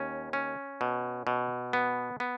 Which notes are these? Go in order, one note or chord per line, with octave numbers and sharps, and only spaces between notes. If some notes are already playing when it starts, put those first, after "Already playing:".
Already playing: D#2 C#4
C#4
B2
B2
B3
B3